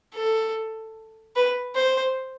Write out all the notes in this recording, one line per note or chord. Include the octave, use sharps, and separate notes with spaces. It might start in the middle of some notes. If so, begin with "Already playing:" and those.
A4
B4
C5